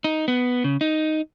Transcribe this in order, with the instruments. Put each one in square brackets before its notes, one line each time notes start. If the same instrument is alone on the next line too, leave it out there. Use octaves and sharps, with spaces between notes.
[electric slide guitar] D#4
B3
C#3
D#4